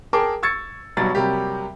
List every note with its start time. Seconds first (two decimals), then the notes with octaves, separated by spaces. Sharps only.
0.13 G#4 A#4 G5 A5 A#5 D6
0.43 C#6 E6 G#6 A6 C#7
0.97 B1 B2 F#3 G3 A6
1.15 C3 F#3 G3 A#3 G4